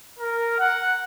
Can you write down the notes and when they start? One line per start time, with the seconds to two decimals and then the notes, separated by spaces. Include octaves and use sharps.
0.19 A#4
0.58 F#5